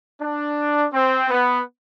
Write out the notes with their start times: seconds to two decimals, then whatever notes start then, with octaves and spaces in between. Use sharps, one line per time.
0.22 D4
0.93 C4
1.30 B3